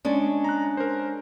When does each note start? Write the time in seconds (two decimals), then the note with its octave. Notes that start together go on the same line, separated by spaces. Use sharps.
0.05 G#3 C#4 D4
0.44 A#5 F#6
0.77 A#4 C5